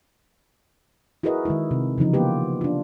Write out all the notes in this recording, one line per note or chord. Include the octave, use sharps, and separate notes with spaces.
E4 F#4 G#4 A#4 B4 D#5
D#3 G#3 E4
C3
C#3 E3 F3 D#4
A#3 B3 F4 G4 B4
D4 F4